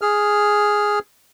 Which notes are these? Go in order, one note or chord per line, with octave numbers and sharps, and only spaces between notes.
G#4 F6